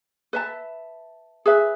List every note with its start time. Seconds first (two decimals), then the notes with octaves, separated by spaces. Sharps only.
0.33 B4 E5 A5
1.46 G#4 B4 E5